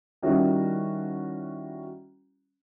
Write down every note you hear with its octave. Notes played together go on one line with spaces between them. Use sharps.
D#3 G3 C#4 E4 F#4